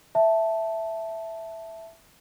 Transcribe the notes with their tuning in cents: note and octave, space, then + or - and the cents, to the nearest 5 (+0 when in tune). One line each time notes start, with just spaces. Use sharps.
E5 +0 A5 +0